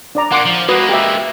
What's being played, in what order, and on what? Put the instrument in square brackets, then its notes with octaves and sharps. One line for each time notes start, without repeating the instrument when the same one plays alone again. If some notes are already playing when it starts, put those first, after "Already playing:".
[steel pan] D4 D5 A#5
[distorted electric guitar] A#2 A#3 [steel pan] F#5 C6 D6
[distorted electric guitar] F3
[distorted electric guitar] G#3 A#3 [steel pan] F#4 B4 D#6
[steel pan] G4 E5